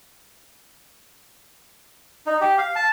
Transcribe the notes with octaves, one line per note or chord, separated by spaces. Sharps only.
D#4
G4
F5
A5